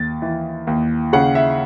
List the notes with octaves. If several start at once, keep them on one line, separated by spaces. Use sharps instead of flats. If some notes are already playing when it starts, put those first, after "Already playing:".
Already playing: D#2 A6
E3
D#2
C#3 F#5
E5